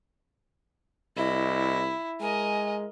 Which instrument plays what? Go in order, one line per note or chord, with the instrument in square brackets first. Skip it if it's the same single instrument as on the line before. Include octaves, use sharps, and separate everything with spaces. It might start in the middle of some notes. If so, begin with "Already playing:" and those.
[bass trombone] C2 [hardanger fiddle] E4 [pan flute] D#5
[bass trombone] G#3 [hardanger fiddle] A#4 D#5 [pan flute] G#5